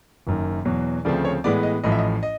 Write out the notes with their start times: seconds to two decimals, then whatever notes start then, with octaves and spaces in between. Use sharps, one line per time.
0.27 F#1 F#2 D#3
0.65 E2 B2 F#3
1.05 D2 C#3 F3 A3 C4 D5
1.25 C#5
1.44 A2 E3 G#3 B3 D5
1.63 D#5
1.84 A1 A2 F3 D#5
1.92 E5
1.99 D#5
2.23 D#5